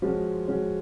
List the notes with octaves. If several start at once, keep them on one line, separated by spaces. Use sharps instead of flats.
F3 G#3 C#4 F#4
F3 G#3 C#4 F#4